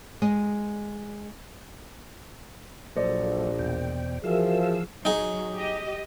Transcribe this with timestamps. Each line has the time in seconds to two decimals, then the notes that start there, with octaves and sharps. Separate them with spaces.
0.22 G#3 D#5
2.96 A#1 F#3 A#3 A4 C5 D5 D#5
3.59 E2 B2 G5
4.24 E3 F3 F#4 G#4 A#4 E5 F5 E6
5.05 F#3 D#4 G#4
5.56 G4 D#5